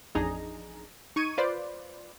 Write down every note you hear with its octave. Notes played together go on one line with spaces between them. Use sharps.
A1 F2 D4 D#4 G#4 A#5
D#4 C#6 G#6 D#7
F4 B4 C5 D5